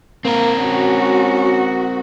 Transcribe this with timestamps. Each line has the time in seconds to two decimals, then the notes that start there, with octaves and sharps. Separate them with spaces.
0.25 A#3 C4 A#4
0.59 C#4 F#4